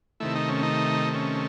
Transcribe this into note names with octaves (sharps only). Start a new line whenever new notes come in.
C3 D#3 A3 E4
D#4
C#4
D#4
C#4